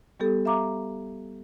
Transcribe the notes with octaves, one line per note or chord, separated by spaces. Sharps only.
G3 B3 G4 A4
E5 F5 A#5 D6